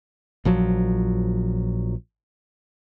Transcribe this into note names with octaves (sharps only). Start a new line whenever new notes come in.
A#1 F3 F#3